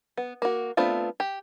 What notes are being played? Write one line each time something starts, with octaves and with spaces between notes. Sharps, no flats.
B3
A#3 F#4
A3 B3 C4 D4 F4
G4